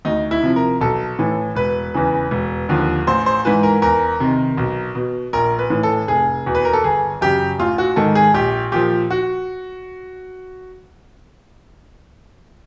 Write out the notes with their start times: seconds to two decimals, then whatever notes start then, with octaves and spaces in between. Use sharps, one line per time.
0.05 D2 D#4
0.31 E4
0.43 C3 F3
0.56 A#4
0.81 B1 A4
1.19 A2 E3
1.56 E1 B4
1.94 E2 C#3 E3
2.31 E1
2.69 D#2 D3 F3
3.07 A1 C5
3.26 C5
3.45 G#2 E3 B4
3.63 A#4
3.82 E2 A#4
4.20 C3 D#3
4.57 B1
4.95 B2
5.33 A#1 A#4
5.59 B4
5.70 A2 E3
5.83 A4
6.08 F1 G#4
6.46 E2 B2
6.55 B4
6.65 A#4
6.73 A4
6.84 G1 G#4
7.21 F#2 C#3 G4
7.59 A1 F4
7.78 F#4
7.96 G#2 D#3 A4
8.15 G#4
8.34 A#1 G4
8.72 A#2 F3 G4
9.10 F#4